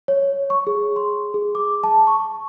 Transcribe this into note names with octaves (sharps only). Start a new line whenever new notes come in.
C#5
C#6
G#4
C6
G#4
D6
A5
C#6